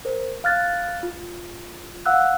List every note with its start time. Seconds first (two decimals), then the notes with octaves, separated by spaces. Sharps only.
0.05 A#4 C5
0.44 F5 F6 F#6 A6
1.03 F4
2.06 F5 F#5 E6 F#6